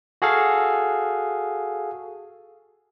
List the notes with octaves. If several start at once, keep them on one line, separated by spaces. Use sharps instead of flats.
F#4 G#4 A4 F5